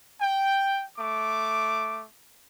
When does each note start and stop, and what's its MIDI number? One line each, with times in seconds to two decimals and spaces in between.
0.21 0.83 79
0.98 2.04 57
0.98 2.04 86